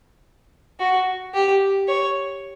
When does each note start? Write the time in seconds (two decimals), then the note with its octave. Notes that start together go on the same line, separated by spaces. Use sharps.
0.80 F#4
1.34 G4
1.88 C#5